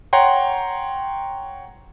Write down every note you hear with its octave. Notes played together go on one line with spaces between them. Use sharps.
C#5 F#5 G5 A#5 C6